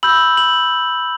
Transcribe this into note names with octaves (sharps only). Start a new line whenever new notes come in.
B5 E6 G6 F#7
F#7